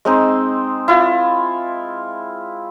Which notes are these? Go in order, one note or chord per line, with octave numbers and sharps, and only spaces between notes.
G#3 C4 D#4
E4 F4